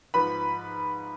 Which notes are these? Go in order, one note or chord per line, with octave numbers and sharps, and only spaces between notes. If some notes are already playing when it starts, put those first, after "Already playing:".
G#2 F3 B4 B5